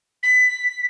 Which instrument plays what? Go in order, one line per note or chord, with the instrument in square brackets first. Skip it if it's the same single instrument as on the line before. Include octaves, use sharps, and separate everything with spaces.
[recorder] B6